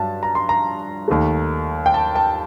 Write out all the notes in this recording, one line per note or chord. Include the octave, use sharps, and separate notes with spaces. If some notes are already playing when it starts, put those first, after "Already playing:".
Already playing: G2 F#3 A5
A#5
C6
A#5
D#2 D#3 A3
G5
A5
A5